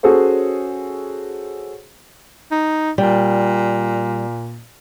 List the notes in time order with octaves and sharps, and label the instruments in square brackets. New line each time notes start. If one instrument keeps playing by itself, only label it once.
[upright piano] C#4 F#4 G#4 A4 C5 C#5
[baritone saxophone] D#4
[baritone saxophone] A#2 [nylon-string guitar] G3